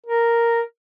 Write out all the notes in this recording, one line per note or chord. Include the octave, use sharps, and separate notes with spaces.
A#4